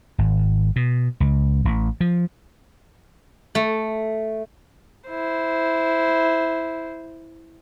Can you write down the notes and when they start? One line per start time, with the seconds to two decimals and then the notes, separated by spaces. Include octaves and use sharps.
0.18 G#1
0.76 B2
1.20 C#2
1.65 A1
2.01 F3
3.55 A3
5.10 E4 C5